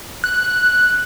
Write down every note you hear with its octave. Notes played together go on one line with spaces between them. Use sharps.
F#6